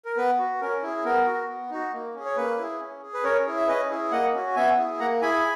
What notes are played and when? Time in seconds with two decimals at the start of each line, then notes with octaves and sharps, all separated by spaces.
0.05 A#4
0.17 B3 B4
0.39 F#4
0.61 C#4 A#4
0.83 E4 G#4
1.05 B3 A#4
1.27 F#4
1.48 B3
1.70 D#4 F#4
1.93 A#3
2.14 C#4 G#4
2.25 C#5
2.36 A#3 B4
2.59 E4 G#4
2.80 C#4
3.02 G#4
3.14 B4
3.24 C#4 A#4 C#5
3.46 E4 G#4
3.57 E5
3.68 C#4 B4 D#5
3.90 E4 G#4
4.11 A#3 D#5 F#5
4.33 C#4 F#4
4.55 B3 E5 G#5
4.77 E4 G#4
4.99 A#3 F#5 A#5
5.21 E4 G#4 G#5 B5